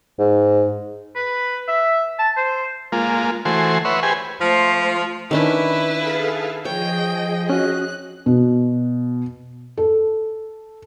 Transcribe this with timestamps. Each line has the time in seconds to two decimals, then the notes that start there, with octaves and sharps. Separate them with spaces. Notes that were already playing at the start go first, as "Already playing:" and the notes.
0.19 G#2
1.16 B4
1.68 E5
2.19 A5
2.37 C5
2.92 G#3 A#3 F4
3.45 E3 A3 F#4 C5 G#5 C6
3.85 B4 C#5 E5 F#5 C6
4.03 G4 G#4 B4 C5 G#5
4.41 F3 A3 C5
5.31 D#3 C#4 D4 E4 B4
5.95 G#4 A4 F5
6.65 F3 G#4 C#5 D#5 G5
7.50 C#4 F#4 F#6
8.26 B2
9.77 A4